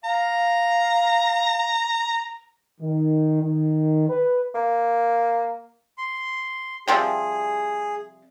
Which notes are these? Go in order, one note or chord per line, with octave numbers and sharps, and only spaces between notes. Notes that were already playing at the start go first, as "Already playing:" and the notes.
F5 A#5
D#3
D#3
B4
A#3
C6
C3 F3 G3 G#4